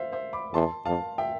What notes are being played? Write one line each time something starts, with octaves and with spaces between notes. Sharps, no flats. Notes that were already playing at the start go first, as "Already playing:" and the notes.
Already playing: C5 E5 F5
C5 E5
B5 D6
E2 A5 C6
F2 F5 A5
E5 G5